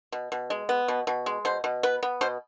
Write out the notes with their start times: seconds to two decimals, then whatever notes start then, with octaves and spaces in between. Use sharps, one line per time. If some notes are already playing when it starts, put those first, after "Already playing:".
0.12 B2
0.32 B2
0.50 G#3
0.69 B3
0.88 B2
1.07 B2
1.26 G#3
1.45 B2 C5
1.64 B2
1.83 B3 B4
2.03 B3
2.21 B2 C5